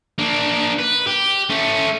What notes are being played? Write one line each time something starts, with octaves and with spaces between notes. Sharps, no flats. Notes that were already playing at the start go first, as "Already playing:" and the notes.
A#3 D4
B4
G4
A3 C#4